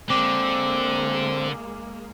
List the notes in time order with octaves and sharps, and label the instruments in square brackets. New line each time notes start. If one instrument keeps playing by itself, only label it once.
[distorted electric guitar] D3 [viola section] G#3 A#3 [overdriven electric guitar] C4 [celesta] D6